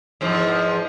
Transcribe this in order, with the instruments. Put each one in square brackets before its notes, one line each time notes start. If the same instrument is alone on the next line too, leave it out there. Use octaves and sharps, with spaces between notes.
[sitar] E2 G#2 F3